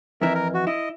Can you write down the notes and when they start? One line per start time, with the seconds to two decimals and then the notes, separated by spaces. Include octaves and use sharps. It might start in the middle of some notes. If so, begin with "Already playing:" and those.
0.22 F2 E3 A#4 E5
0.35 A#4
0.54 F#4
0.67 E4 D#5